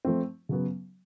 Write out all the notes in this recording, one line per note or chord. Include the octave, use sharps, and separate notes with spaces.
F3 A3 C4
C#3 F#3 B3